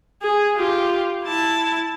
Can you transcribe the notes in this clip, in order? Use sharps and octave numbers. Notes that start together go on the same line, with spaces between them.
G#4
F4 G4
E4 A5